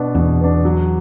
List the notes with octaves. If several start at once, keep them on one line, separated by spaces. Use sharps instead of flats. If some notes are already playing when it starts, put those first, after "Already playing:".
Already playing: B2 B3 D4
E2 B2
B3 D4
F#3